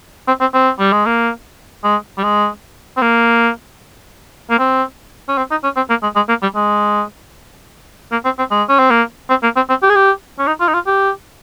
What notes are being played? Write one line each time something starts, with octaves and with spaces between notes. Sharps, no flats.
C4
C4
C4
G3
G#3
A#3
G#3
G3
G#3
C4
A#3
A#3
C4
C#4
C4
D#4
C#4
C4
A#3
G#3
G#3
A#3
G3
G#3
A#3
C4
C4
G#3
C#4
C4
A#3
C4
A#3
C4
C4
G4
G#4
G4
C#4
D#4
F4
D#4
F4
G4